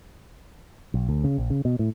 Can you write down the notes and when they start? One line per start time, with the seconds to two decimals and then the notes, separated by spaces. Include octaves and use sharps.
0.94 B1
1.09 D2
1.24 C#3
1.38 A#1
1.50 C#3
1.65 B2
1.79 A2